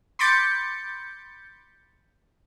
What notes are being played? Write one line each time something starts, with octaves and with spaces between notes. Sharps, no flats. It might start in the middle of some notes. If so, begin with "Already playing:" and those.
B5 C6 D6 G6 A6 C#7